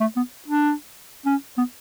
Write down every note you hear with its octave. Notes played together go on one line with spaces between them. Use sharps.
A3
B3
D4
C#4
B3